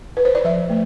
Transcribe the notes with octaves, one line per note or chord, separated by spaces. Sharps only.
B4
C5
D5
F3 E5
A3